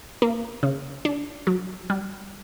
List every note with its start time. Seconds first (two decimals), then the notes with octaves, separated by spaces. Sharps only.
0.22 A#3
0.63 C#3
1.05 D4
1.47 F#3
1.90 G3